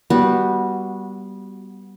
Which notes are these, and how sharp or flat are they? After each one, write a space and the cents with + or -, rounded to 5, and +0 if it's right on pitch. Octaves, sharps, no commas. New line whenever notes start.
G3 -10 B3 -20 F#4 +0